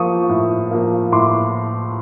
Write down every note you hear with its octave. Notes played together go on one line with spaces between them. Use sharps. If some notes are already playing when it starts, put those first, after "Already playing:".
Already playing: F3 A#3 C#6 D#6
A2
F3 A#3
A2 C6 D6